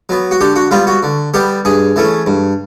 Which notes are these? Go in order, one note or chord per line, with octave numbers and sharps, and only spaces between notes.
F#3 B3
F#4
D3 G4
F#4
G3 B3 F4
F#4
D3
G3 B3 G4
G2 G#4
E3 A3 C#4
G2